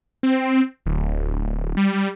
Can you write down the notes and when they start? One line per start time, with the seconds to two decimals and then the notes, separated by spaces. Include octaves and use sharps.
0.23 C4
0.86 D1
1.77 G3